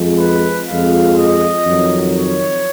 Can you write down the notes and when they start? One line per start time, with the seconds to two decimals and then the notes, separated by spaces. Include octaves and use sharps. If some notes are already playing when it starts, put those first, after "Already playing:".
Already playing: F2 F3 G#3
0.18 B4
0.67 F2 F3 G#3 F5
1.17 D#5
1.65 F2 D#3 F#3
2.15 C#5